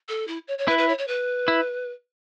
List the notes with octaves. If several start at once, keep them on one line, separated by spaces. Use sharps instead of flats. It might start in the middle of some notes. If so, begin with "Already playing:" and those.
A4
E4
C#5
C#5
E4 B4
B4
C#5
C#5
B4
E4